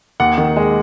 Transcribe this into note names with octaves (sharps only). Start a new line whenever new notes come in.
D#2 F#5
D#3
G#3